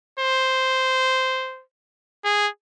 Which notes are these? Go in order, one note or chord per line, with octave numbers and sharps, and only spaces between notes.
C5
G#4